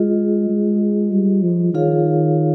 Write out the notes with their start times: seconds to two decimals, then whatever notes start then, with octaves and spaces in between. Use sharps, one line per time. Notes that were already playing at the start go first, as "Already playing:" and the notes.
Already playing: G#3 F4 G#4 D#5
0.49 G#3
1.11 G3
1.43 F3
1.74 D#3 F4 G#4 C#5 F5